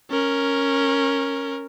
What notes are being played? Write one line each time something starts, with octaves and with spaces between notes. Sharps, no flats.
C#4 A#4